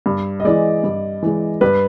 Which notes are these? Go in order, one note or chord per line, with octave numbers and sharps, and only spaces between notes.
G2
D#5
E3 G#3 D5
G2
E3 G#3
G2 B4